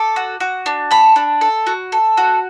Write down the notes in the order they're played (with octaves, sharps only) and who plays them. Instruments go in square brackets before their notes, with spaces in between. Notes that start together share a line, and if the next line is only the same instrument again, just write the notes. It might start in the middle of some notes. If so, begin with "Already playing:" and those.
Already playing: [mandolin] A4 D6
F#4
F#4
D4
A4 B5
D4
A4
F#4
A4
F#4